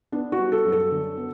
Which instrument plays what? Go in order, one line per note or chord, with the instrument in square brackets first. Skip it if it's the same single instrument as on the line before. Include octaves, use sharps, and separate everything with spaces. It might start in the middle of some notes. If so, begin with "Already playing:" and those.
[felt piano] B3 D4
F#4
G3
A4
F#2
A4
D3
B3